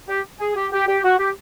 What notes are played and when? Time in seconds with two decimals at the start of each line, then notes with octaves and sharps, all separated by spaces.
0.08 G4
0.40 G#4
0.55 G4
0.72 G4
0.87 G4
1.04 F#4
1.18 G4